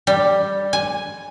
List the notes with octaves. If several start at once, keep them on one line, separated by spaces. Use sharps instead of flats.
G3
G#5